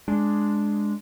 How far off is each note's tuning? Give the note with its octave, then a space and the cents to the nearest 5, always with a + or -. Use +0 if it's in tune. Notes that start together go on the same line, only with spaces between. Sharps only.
G#3 +0 D4 +0